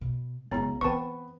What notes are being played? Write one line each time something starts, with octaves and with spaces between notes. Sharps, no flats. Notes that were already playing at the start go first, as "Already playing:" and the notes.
B2
C#2 F#2 B3 E4 G#4 C#5 A#5
E3 B3 C4 B4 G5 A5 C#6